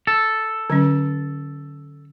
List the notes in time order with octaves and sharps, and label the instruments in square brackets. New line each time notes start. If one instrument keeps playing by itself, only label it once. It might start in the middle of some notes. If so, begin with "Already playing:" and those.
[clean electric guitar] A4
[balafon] D3 F#3 C#4